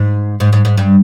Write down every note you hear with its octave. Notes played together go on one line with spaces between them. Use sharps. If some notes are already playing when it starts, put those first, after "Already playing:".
Already playing: G#2
G#2
G#2
G#2
G2